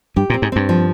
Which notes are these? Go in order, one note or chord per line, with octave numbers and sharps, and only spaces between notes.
G2 G4
A#2
C4
G#2
G2 C4
F3